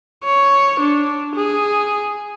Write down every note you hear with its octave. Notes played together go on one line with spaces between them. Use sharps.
C#5
D4
G#4